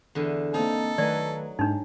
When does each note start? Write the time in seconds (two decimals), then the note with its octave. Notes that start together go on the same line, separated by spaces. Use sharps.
0.15 E2 D3
0.54 A#3 C4 D#4 A4
0.98 D#3 F#3 A3 B4 D5 G#5
1.59 G#2 D4 D#4